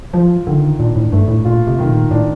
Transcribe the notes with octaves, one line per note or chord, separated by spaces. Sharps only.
F3 F4
D3 D#3
A#2 D4
A2
G2 A3
A2
A#2 F4
C3
C3 D#3
A#2
A2 D4